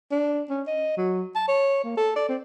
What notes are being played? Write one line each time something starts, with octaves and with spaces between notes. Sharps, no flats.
D4
C#4
D#5
F#3
A5
C#5
A#3
A4
D5
C4